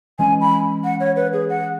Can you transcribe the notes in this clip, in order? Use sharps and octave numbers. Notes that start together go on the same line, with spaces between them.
E3 G#3 C#4 G#5
B5
F#5
C#5
B4
G#4
F#5